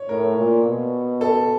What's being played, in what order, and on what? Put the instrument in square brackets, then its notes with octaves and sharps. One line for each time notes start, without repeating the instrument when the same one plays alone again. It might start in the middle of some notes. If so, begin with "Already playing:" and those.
Already playing: [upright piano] C#5
[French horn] A2 [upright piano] A#4
[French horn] A#2
B2
[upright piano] A4